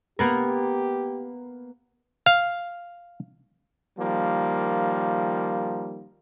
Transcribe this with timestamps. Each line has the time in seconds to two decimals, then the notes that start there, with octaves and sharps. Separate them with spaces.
0.19 A#3 B3 G4 A#4
2.26 F5
3.98 D#3 F3 G3 A#3